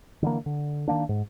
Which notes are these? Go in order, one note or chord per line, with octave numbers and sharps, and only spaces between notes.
D3 E3 A#3
D3
D#3 E3 A#3 D4
G#2